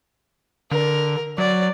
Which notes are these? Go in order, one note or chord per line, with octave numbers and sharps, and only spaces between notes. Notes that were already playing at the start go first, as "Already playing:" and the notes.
D3 A#4
F#3 D5